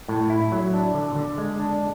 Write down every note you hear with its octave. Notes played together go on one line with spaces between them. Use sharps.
A2
E4
F#3
D4
D3
D3
G#3
D4